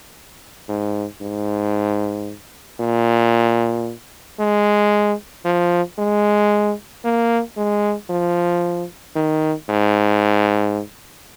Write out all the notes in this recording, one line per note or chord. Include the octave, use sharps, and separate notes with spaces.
G#2
G#2
A#2
G#3
F3
G#3
A#3
G#3
F3
D#3
G#2